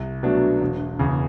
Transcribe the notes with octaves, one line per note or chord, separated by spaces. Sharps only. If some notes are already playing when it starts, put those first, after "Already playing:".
Already playing: C2
B2 F#3 A3 D4
E1
E2 C#3